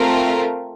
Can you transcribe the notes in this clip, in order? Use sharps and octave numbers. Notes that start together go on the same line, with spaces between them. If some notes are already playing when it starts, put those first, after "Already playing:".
Already playing: A3 C4 F4 A#4